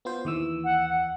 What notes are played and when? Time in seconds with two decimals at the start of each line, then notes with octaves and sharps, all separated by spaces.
0.05 B3 F4 C5
0.25 D#2 E3 E6
0.64 F#5
0.89 F#5